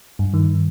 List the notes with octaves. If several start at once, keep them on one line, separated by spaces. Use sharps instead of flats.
G2
D#3